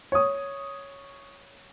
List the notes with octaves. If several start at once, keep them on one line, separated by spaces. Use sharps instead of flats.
C#5 D#6